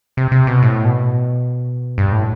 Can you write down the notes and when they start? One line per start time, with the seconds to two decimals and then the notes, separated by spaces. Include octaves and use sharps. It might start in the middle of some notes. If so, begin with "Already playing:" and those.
0.17 C3
0.32 C3
0.47 B2
0.63 A2
0.85 B2
1.98 G2
2.13 A2